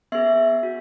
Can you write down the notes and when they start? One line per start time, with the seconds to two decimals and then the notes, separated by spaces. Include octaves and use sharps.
0.12 B3 G#4 E5
0.63 F#4